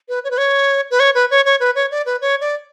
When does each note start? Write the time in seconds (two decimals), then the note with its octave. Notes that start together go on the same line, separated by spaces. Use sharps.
0.09 B4
0.24 C#5
0.31 B4
0.38 C#5
0.91 B4
1.00 C#5
1.15 B4
1.31 C#5
1.45 C#5
1.60 B4
1.75 C#5
1.91 D5
2.06 B4
2.21 C#5
2.41 D5